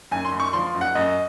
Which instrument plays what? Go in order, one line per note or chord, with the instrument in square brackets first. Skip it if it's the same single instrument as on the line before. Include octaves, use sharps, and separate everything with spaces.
[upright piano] F#2 G#5
C6
F#2
C#6
F3 C6
F#2
F#5
F#2 D#5